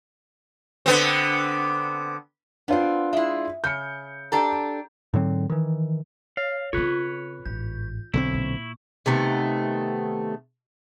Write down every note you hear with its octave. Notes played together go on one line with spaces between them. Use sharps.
D3 B3 C4
B3 C4 D4 F4
G#3 E4 E5
C#3 G6 C#7
D4 G4 A4 A#5
G#2 D3 F#3 C4
D#3 E3
C#5 F5
C#3 C4 F4 B4 C#5
A1 G#2 G6
B1 F#2 D3 C4 E4 C#6
A#2
C3 D#3 A3 B3